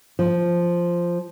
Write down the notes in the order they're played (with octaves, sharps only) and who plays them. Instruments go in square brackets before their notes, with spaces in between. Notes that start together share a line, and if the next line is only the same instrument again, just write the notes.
[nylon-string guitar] F3